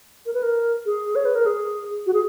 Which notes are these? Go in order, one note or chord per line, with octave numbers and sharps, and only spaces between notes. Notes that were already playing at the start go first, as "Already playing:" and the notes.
A#4
B4
A#4
G#4
C#5
B4
A#4
G#4
F#4
G#4